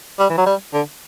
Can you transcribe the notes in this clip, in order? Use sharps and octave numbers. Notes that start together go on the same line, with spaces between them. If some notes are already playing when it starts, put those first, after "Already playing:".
G3
E3
F#3
G3
D3